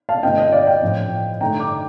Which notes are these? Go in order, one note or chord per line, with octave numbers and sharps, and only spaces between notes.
F5 A5
G2 D3 A3 C4 F4 D#5 G5
D#5
D5 F5
D#5 G5
A2 F3 C4
G2 D3 A3 D#4 G5 A#5
A#5 D6